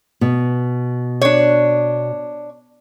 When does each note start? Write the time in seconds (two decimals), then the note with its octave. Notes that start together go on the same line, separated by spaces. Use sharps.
0.21 B2
1.21 D4 C#5